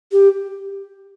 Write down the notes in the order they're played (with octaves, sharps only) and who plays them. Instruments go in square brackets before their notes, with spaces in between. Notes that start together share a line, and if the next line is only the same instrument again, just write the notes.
[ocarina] G4